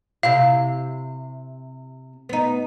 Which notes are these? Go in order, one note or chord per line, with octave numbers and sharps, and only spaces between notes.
C3 E4 G4 F5
B3 D#4